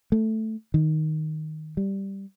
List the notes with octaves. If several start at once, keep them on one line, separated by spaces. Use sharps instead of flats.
A3
D#3
G3